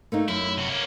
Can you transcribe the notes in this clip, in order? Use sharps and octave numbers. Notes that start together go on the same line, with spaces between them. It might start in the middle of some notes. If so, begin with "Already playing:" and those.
A3 A#3 D#4
F#2 E4
C3 F#4
A#3 C#4